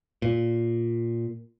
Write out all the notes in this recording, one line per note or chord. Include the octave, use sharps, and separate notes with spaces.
A#2